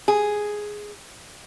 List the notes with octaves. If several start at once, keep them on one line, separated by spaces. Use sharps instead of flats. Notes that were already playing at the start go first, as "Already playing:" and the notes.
G#4